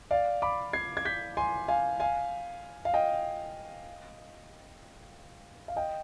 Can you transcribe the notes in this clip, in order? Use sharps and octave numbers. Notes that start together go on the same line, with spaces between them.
D5 F5
B5 D6
G#6 C7
G#6
G6 B6
G#5 C6
F5 G#5
F5 G#5
F5
D#5 G5
F5
D#5 G5